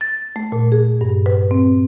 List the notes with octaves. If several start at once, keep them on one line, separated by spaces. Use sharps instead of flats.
A6
A3
A#2
G#4
G2
B4
C4